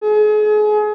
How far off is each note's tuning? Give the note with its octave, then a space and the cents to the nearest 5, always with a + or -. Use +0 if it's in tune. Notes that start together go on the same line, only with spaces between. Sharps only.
G#4 +35